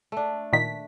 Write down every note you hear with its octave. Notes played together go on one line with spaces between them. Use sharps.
A3 D4
A#2 D#3 B6